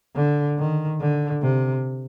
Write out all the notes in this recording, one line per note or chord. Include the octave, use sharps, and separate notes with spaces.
D3
D#3
D3
C3